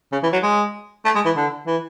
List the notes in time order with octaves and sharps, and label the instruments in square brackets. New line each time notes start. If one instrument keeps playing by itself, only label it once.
[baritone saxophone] C#3
E3
F#3
G#3
A3
G#3
E3
D3
E3